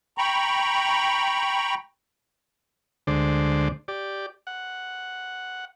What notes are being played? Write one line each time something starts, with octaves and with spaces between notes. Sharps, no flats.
G5 A#5 B5 C#6
D2 D3 G#3 C5 D5
G4 D5
F#5